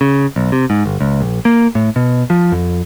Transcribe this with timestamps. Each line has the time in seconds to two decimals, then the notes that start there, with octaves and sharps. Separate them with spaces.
0.01 C#3
0.36 B1
0.52 C3
0.70 G#2
0.86 G1
1.01 C#2
1.21 A#1
1.45 A#3
1.75 A2
1.96 B2
2.30 F3
2.52 F2